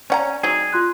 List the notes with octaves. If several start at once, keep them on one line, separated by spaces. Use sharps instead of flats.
C#4 C#5 D5 F#5 A#5
F#3 C4 D#4 G#4
F4 C6 F#6